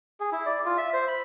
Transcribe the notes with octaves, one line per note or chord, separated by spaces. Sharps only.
G#4
E4
D5
F4
E5
C5
B5